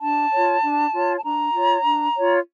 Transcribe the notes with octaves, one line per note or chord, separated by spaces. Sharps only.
D4 A5
F4 C#5
D4
F4 C#5
A5
D4 A#5
F4 C#5
D4
F4 C#5